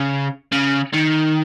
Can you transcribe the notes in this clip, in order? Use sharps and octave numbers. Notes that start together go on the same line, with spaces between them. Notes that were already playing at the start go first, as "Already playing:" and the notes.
Already playing: C#3
C#3
D#3